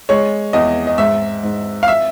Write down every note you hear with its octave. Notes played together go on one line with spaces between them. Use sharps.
G#3 C#5
E2 D#5
D#5
G#2 E5
G#2
F5
E5